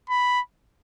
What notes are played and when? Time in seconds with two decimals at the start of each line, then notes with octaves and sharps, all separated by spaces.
0.10 B5